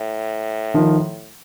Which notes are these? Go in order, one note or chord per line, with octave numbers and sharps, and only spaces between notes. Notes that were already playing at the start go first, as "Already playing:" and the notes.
Already playing: A2
D#3 F3